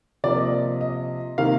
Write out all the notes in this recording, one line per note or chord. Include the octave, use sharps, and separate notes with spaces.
C3 F3 A#3 D5
D#5
D#5
C3 D#3 A#3 F5